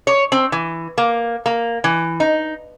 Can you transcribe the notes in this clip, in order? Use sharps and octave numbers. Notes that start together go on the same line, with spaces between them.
C#5
C4
E3
A#3
A#3
E3
D#4